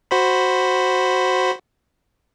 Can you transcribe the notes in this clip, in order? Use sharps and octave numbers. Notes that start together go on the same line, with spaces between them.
F#4 C5 B5